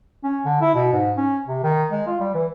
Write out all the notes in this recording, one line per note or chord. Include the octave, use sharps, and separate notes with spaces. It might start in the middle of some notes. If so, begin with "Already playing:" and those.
C#4
D3
E4
B2
G#2
C#4
C3
D#3
G#3
F4
G3
E3